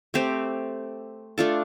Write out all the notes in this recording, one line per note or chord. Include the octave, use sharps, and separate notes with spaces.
A3 C4 G4 C5
A3 D4 F4 A4